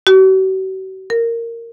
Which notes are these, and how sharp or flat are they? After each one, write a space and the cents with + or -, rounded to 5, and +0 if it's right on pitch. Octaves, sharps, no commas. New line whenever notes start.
F#4 +45
A#4 -10